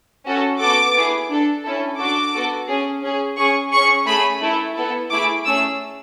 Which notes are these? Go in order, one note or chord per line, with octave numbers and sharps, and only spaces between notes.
C#4 F#4 A4
B3 F#4 A4 D6
B3 E4 G#4
D4 A4
C#4 E4 A4
D4 F#4 A4 D6
B3 F#4 A4
C#4 G#4
C#4 G#4
C#4 G#4 C#6
C#4 G#4 C#6
A3 C#4 G#4 B5
A3 E4 A4
B3 E4 A4
A3 E4 G#4 D6
A3 C#4 G#4 E6